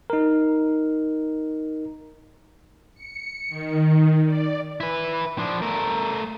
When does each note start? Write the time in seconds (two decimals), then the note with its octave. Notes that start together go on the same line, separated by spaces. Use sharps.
0.10 D#4 A#4
2.95 C#7
3.48 D#3
4.25 D5
4.80 E4 B4
5.39 F3 D4
5.62 A3 A#4